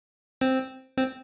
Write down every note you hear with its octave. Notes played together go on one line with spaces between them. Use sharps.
C4
C4